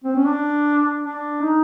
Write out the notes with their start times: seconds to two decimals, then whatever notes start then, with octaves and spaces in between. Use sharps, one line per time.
0.04 C4
0.16 C#4
0.27 D4
1.03 D4
1.42 D#4